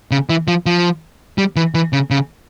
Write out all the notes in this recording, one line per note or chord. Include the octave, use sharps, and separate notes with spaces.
C#3
E3
F3
F3
G3
E3
E3
C#3
C#3